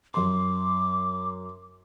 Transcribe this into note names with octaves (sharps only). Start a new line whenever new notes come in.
F#2 C6 D6